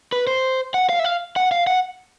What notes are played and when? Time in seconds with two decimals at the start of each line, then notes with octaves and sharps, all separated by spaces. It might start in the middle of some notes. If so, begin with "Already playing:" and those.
0.12 B4
0.27 C5
0.74 F#5
0.89 F5
0.99 E5
1.05 F5
1.36 F#5
1.51 F5
1.67 F#5